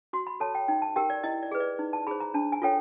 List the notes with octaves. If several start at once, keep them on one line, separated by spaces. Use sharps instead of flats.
F#4 C6
B5
A4 C#5 A5
G5
D#4 G5
A5
G4 A#4 G5
D5
E4 D#5
D5
G#4 B4
D5
D#4
A5
G#4 C5 B5
A#5
D4 A5
G#5
F4 A4 C#5 G5